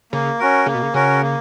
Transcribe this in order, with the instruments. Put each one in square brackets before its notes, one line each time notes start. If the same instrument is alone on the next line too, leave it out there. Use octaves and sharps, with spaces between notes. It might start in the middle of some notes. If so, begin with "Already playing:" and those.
[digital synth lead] C#3 [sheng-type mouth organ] A#3
[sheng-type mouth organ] C#4 F#4 A#4
[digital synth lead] C#3 [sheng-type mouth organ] A#3
[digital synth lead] B2
C#3
[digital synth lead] C#3 [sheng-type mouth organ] C#4 F#4 A#4
[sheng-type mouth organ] A#3